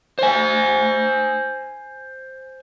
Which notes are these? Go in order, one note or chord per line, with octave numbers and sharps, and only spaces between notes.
C5 G#5